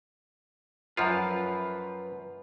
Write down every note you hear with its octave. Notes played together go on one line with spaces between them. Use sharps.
F#2 F3 F4 B4